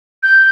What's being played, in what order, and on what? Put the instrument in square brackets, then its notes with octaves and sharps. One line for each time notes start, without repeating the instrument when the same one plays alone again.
[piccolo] G6